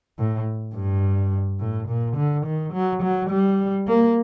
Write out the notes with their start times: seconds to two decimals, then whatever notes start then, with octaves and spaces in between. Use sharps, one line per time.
0.19 A2
0.75 G2
1.60 A2
1.88 A#2
2.17 D3
2.46 D#3
2.73 F#3
3.03 F#3
3.30 G3
3.88 A#3